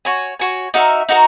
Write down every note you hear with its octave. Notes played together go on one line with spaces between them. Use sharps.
F#4 C#5 G#5
F#4 C#5 G#5
D#4 F#4 A#4 E5
D#4 F#4 A#4